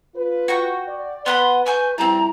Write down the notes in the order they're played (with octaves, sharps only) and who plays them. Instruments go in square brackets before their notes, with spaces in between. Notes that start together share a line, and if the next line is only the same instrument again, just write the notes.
[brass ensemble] F4 B4
[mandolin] F#4 G5 C#6
[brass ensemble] D5
[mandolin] B3 F#5 B5 [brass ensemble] B4 [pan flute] C6
[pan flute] G#5 [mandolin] C#6 G6
[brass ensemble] F2 G3 E4 [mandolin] C4 A5 [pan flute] A#5